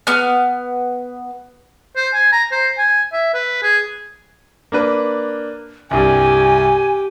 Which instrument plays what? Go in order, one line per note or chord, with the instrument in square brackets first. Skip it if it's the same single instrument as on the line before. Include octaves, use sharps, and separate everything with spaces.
[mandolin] B3 F6
[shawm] C5
G#5
A#5
C5
G#5
E5
B4
G#4
[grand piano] A#3 D4 B4
[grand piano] C2 G2 [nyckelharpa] G4 [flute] G#5